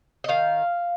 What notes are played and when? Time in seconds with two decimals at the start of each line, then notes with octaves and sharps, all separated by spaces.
0.24 D#5
0.28 D#3 F5